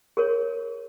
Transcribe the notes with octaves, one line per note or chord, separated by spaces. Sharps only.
G#4 A#4 C#5